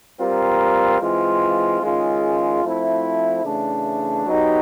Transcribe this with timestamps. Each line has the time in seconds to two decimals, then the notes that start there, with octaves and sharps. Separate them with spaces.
0.18 G3 C4 F4 A#4
1.00 E3 G#3 C4 F4
1.81 D#3 G#3 C#4 F4 G#4
2.63 F3 A3 C4 E4
3.44 C#3 E3 A3 D4
4.26 F#3 B3 D#4 G4 B4